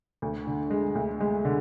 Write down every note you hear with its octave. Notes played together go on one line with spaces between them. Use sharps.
D2
D3
G#3
D2
G#3
D3